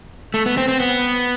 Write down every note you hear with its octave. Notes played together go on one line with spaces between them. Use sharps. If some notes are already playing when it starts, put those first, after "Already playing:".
A3
B3
C4
C4
B3